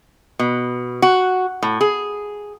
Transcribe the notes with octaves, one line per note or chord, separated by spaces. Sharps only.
B2
F#4
A2
G#4